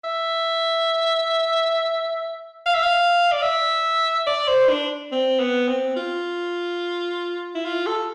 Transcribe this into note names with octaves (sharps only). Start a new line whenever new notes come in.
E5
F5
E5
F5
D5
E5
D5
C5
D4
C4
B3
C4
F4
E4
F4
A4